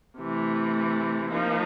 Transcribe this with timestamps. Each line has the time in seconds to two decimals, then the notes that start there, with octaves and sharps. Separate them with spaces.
0.19 C3 E3 A3
1.32 F3 A#3 D#4